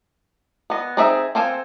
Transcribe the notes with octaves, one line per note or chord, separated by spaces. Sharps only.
B3 D#5
C4 D#4 G#4 C5 E5
C4 A4 C5 F5 G#5